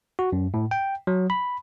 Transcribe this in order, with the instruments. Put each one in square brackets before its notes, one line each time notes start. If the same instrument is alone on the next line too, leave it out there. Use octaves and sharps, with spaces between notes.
[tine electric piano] F#4
F#2
A2
G5
F#3
B5